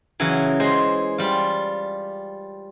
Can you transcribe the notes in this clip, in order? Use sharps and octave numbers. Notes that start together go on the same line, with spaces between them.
C#3 E3 F#3
G#3 C5
G3 F4